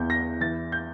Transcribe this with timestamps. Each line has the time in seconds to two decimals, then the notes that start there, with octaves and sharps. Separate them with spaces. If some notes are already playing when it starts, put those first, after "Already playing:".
Already playing: E2 E3 G6
0.10 A#6
0.40 E3 A6
0.72 G6